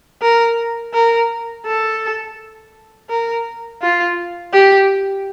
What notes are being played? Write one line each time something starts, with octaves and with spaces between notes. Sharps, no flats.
A#4
A#4
A4
A#4
F4
G4